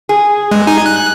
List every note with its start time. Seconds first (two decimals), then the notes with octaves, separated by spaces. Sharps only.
0.09 G#4
0.51 G2 G#3
0.67 D#4 G#5
0.86 F#6